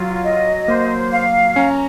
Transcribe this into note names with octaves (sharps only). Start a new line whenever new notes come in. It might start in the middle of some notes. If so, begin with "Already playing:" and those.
Already playing: F#3 F4
D#5
A#3 C5
F5
C#4 A#5